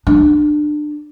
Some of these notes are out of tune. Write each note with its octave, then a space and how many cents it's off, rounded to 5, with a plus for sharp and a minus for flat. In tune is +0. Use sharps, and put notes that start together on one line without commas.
D4 +25